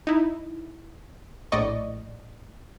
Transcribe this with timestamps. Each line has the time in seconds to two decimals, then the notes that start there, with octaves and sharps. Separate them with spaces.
0.07 D#4 E4
1.52 A#1 A2 D5 D#5 C#6